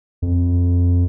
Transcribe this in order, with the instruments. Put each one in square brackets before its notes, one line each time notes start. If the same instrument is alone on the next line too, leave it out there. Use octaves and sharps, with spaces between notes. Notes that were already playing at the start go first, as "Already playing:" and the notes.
[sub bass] F2